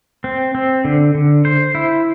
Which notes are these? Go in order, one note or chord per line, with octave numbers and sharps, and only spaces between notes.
C4
C4
D3
D3
C5
E4